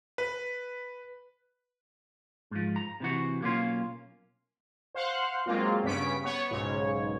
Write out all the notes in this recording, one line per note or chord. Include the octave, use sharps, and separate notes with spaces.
B4
G#2 F3
A#5
C3 E3 F#4
B1 A#3 C#4 F4
C5 F5 F#5 C6 F#6
F#3 G#3 A#3 C4 F4
G2 C#3 B3 C#4 B6 D7
B3 C#5 C#6
B1 G#2 C#3 C#5